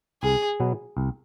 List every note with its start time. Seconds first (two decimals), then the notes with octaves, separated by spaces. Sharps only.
0.23 C2 G#4
0.60 B2 F#3 B3
0.97 C2